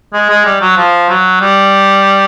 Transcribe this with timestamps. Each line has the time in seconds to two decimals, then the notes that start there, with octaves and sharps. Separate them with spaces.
0.13 G#3
0.29 G#3
0.45 G3
0.61 F#3
0.77 F3
1.09 F#3
1.41 G3